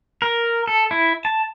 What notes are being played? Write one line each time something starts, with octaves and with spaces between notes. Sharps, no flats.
A#4
A4
E4
A5